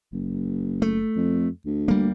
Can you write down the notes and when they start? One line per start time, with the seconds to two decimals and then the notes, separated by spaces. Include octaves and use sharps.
0.12 F#1
0.82 A3
1.16 F2
1.65 D2
1.88 G3 A#3